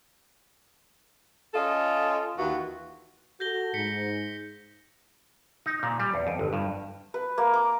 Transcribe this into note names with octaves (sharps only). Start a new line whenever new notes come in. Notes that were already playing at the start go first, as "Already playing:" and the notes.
C#4 F4 A4 D#5
D#2 E3 F4 F#4
F#4 A4 G6 A#6 G7
G#2 B6 C#7
D#4
A#2
G3
E2
F2
G1
G2
B4
A#3
D6